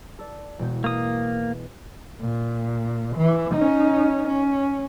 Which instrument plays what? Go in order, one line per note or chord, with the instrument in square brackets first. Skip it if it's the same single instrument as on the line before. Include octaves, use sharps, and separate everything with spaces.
[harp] A4 D5
E1 B2 G6
[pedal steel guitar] A#3 D#6
[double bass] A#2
E3
C#4 D#4
C#4